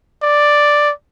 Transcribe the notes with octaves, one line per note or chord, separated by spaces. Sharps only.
D5